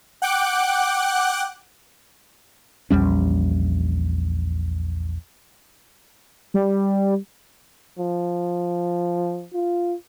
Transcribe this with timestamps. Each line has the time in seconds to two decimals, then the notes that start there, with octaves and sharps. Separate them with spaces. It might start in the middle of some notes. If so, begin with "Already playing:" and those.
0.22 F#5 G5 D6 F#6
2.91 A#1 E2 G3 C#4
6.54 G3
7.99 F3
9.53 F4